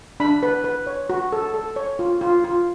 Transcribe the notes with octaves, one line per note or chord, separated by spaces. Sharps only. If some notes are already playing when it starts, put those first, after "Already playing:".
D4 B5
B4
B4
C#5
F#4
A4
A4
C#5
F4
F4
F4